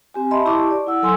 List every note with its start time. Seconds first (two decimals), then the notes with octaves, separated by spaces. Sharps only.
0.14 C4 G4 G#5
0.31 D#5 E5 A5 B5 C6
0.45 E4 G4 A5 C#6 D6
0.71 D5
0.87 E4 F#5 E6
1.02 F#3 A4 G#5 C6 E6